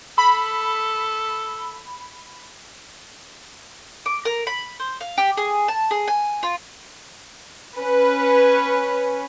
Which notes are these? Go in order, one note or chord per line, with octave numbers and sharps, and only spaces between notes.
A4 B5
D6
A#4
B5
C5
F5
G4
G#4
A5
G#4
G#5
F4
C#4 B4